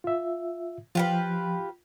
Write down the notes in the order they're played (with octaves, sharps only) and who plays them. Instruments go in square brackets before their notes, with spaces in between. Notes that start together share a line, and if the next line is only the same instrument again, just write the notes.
[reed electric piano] F4 E5
[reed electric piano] F3 [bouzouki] F4 G4 B4